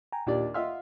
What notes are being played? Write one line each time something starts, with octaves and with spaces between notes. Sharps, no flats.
G5 G#5 A#5
D#2 A#2 D4 F4 G4 D5
F4 D#5 E5 F#5 C6 F6